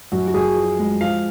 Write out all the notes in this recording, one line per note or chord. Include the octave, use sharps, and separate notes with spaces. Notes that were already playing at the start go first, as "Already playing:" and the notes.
F#2 F#4
F#4
F#2 G#4
F3
G#3
F3 F5